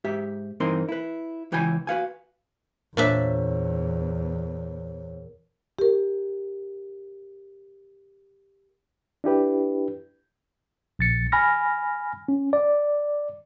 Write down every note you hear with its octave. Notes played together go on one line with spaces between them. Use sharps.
G#2 G4 E5
G2 E3 C4 D#4 A#4 C6
E4 B4
C#2 E3 C#5 G5 G#5 B5
F#4 B4 F5 G#5
E2 A#2 D4 A#4 C5 C#5 E5
G4 A#4
D4 E4 G4 B4
A#1 A6 C#7
G#5 B5 F6 A#6
C#4
D5